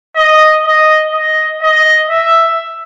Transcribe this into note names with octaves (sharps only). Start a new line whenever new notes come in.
D#5
D#5
D#5
D#5
E5